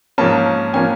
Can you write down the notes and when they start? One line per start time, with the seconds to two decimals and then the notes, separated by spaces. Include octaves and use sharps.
0.18 G#2 F3 A#3 C#4 A5
0.74 F3 A#3 C#4 G#5